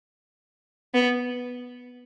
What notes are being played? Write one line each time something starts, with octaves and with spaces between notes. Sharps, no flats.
B3